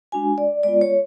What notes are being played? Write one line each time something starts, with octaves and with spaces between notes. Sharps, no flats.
G#3 D4 F#4 G#5
D5
G#3 B3 F4 D5
C#5